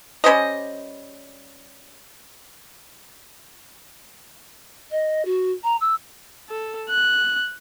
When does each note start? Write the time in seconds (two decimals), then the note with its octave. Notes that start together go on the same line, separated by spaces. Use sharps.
0.24 G3 C#4 C5 D#5
4.90 D#5
5.25 F#4
5.63 A#5
5.80 E6
6.50 A4
6.89 F#6